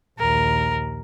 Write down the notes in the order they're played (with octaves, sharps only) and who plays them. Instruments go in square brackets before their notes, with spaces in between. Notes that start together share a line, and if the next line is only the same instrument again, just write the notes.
[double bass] A#1 D#2 [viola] A#4